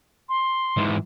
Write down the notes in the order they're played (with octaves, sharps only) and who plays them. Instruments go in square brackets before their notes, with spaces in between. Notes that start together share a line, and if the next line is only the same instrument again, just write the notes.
[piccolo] C6
[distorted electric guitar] G#2 E3